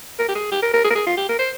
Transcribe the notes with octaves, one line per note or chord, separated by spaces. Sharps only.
A#4
G4
G#4
G4
A#4
A#4
G#4
A#4
G#4
F4
G4
A#4
C5